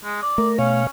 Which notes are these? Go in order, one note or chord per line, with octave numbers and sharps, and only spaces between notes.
G#3
D5
A3 A#4
B2 C#4 C#5 F5